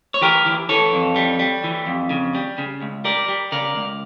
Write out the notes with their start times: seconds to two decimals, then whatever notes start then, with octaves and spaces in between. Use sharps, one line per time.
0.14 C#5
0.21 E3 G4 A#4
0.46 E3
0.69 E3 A4 C#5
0.93 F2
1.16 G3
1.39 G3
1.64 E3
1.86 F2
2.10 C#3
2.35 G3
2.58 C#3
2.82 C#2
3.05 G3 A#4 D5
3.28 G3
3.52 C#3 A#4 D5
3.76 C#2